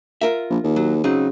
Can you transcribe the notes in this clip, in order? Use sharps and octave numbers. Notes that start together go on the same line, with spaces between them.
F4 A#4 E5
A#1
D#2
F#3
C#3 F#3 C4 D#4